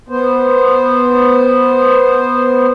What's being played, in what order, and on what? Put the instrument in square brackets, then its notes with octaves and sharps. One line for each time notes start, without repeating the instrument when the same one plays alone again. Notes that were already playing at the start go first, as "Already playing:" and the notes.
[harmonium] B3 C5